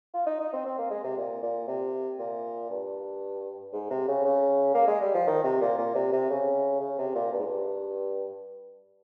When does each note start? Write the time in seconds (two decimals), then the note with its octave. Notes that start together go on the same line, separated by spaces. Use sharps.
0.14 F4
0.26 D#4
0.40 D#4
0.53 C4
0.65 C4
0.79 A#3
0.91 G#3
1.04 C3
1.17 A#2
1.43 A#2
1.68 C3
2.19 A#2
2.70 G2
3.73 G#2
3.90 C3
4.08 C#3
4.25 C#3
4.74 A#3
4.87 G#3
5.01 G3
5.14 F3
5.27 D#3
5.44 C3
5.61 A#2
5.78 A#2
5.95 C3
6.12 C3
6.30 C#3
6.80 C#3
6.99 C3
7.15 A#2
7.32 G2
7.39 G#2
7.47 G2